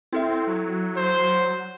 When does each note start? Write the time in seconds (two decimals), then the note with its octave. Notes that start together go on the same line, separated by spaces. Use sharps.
0.13 C4 E4 A4 E5
0.47 F#3
0.96 C5